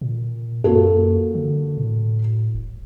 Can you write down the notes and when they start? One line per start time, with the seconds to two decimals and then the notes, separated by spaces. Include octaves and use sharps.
0.01 A#2
0.64 F#2 A#3 F#4 A4
1.35 D3
1.78 A2
2.55 D#1